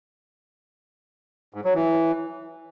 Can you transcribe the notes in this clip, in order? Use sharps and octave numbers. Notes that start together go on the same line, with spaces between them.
G#2
F#3
E3